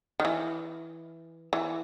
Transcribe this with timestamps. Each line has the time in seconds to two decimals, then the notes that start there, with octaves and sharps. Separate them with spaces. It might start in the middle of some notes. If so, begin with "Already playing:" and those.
0.20 D#3
0.25 E3
1.53 E3